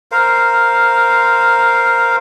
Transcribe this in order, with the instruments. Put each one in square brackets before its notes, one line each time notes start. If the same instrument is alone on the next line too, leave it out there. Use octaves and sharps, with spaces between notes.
[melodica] A#4 C5 F5